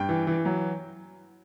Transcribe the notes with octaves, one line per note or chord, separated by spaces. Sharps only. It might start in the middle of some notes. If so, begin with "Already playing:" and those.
Already playing: G2 G5
E3
E3
F#3